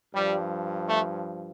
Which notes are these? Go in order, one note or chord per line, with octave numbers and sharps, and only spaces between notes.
G2 F3 G3
A3